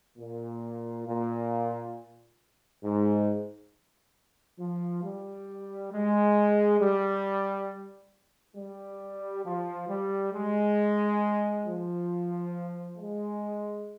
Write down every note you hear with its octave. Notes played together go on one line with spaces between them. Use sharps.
A#2
A#2
G#2
F3
G3
G#3
G3
G3
F3
G3
G#3
F3
G#3